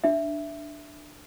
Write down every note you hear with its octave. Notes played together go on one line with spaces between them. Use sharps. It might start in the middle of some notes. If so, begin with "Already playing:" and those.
D4 E5